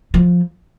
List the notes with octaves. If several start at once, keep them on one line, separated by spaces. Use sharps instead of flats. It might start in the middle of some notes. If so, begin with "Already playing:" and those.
F3